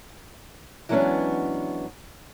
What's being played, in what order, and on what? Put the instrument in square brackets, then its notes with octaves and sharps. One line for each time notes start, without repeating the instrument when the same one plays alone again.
[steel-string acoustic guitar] E3 F#3 G#3 B3 C#4 D4